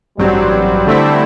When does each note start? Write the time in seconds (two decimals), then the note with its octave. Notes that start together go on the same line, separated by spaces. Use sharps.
0.18 A1 G2 F#3 G3 C4
0.87 D3 A3 C4 E4